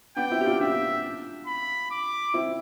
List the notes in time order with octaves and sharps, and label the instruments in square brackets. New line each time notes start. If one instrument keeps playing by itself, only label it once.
[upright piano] B3 D4 [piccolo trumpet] G5
[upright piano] C4 E4
G4
D4 F4
[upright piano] D4 F4 [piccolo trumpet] E5
[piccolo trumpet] B5
D6
[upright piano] C4 E4